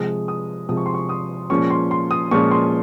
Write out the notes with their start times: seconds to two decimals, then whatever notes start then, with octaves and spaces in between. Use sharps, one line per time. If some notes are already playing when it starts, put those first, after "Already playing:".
Already playing: C3 F3 G#3 D#6
0.28 D#6
0.69 C3 F3 G#3 D#6
0.77 C#6
0.86 C6
0.94 C#6
1.09 D#6
1.50 A#2 F3 G#3 C#4 C#6
1.70 C6
1.91 C6
2.11 D#6
2.31 A#2 F3 G#3 C#4 C#6
2.51 C6